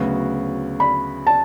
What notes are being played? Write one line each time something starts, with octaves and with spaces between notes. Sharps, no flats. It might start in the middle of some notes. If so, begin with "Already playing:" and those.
Already playing: D2 C#3 F#3 B3 F#4
B5
A5